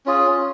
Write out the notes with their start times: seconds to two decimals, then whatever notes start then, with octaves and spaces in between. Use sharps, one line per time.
0.06 C#4 F4 G#4